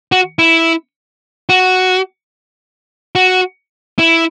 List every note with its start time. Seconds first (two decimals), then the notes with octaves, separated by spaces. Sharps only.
0.12 F#4
0.39 E4
1.49 F#4
3.15 F#4
3.99 E4